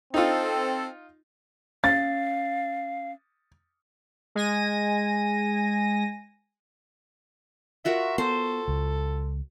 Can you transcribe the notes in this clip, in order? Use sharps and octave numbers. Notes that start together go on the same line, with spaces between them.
C4 D#4 F4 A4
C#4 F5 A6
G#3 G#5 A#6 D#7
F4 F#4 A#4 E5
B3 A4 C5
C#2